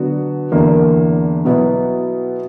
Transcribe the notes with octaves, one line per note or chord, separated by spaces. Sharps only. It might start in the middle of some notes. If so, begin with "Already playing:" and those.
Already playing: D3 F#3 B3 F#4
E2 D3 A#3 E4
B2 F#3 B3 E4